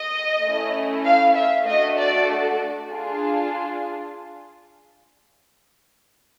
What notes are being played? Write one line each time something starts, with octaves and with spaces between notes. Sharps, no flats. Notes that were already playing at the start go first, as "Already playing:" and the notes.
Already playing: D#5
A3 C#4 E4
F5
E5
A3 D4 F#4 A4 D#5
D5
D4 F4 G#4